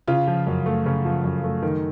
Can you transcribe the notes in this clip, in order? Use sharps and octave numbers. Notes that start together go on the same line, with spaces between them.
C#3 F4
F3
F#2
A3
C#3
F3
F#2
A3
D#3